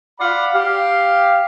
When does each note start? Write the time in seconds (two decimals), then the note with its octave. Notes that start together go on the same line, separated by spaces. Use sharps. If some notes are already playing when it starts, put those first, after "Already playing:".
0.20 D5 F5 F#5 B5
0.54 G4 F5